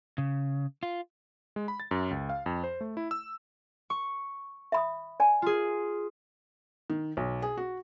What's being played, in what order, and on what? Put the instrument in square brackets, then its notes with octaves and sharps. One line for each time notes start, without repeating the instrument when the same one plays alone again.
[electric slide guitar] C#3
F4
[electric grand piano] G#3
B5
A6
F#2
C#2
F5
F2
C5
A3
E4
E6
[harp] C#6
[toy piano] E5 B5 D#6
D5 G#5
[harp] F4 G#4
[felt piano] D#3
B1
G#4
F#4